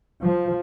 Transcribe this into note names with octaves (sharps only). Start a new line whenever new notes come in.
F3